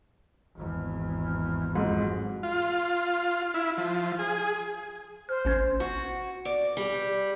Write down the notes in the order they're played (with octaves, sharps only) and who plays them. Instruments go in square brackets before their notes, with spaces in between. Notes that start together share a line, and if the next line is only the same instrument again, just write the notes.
[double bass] G#1 E2
[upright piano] F2 G#2 F#3
[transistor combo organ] F4
E4
F3
G#4
[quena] C5 [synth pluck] F6
[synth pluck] A1 C#4 G#6
[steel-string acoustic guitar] F#4
D5
G3